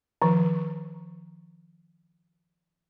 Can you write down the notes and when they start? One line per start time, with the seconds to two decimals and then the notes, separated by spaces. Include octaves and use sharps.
0.22 D#3 F3